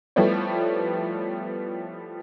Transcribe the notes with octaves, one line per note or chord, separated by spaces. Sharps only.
F3 G3 A3 B3 E4 C#5